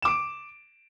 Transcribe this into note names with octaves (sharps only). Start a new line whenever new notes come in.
D6 D7 E7